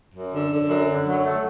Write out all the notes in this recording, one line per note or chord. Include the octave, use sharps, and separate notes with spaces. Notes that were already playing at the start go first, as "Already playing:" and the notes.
F#2
D3
D3
F#2
D3
F#3
A3